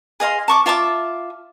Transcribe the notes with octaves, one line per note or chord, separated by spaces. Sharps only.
G#4 D#5 F5 C6
A5 C#6 D6
F4 E5 A5 D6